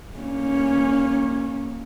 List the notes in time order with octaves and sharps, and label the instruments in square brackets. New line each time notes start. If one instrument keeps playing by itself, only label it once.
[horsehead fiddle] A#3 C#4